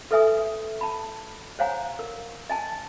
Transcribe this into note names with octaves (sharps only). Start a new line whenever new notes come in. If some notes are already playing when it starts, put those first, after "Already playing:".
A4 B4 E5 G#5 D#6
A5 B5
C5 C#5 F5 F#5 G#5 A#5
A#4
D#5 G#5 A5